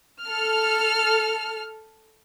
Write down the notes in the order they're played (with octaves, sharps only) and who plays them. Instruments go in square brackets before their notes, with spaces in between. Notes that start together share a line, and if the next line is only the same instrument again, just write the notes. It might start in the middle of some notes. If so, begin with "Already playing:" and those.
[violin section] A4 F6